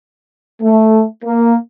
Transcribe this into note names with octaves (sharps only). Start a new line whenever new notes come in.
A3
A#3